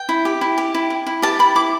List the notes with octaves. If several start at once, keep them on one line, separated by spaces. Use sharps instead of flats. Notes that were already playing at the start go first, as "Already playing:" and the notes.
Already playing: G5
E4
G4
E4
G4
E4
E4
E4
G4 A5
E4 B5
E4 D6